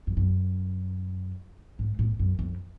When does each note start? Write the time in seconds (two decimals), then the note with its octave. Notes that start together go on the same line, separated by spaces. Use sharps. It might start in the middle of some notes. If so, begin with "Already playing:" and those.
0.07 F2
0.17 F#2
1.79 G#2
1.99 A2
2.19 F#2
2.39 F2